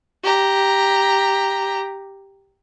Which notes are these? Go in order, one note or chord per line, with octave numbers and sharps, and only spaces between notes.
G4 A#5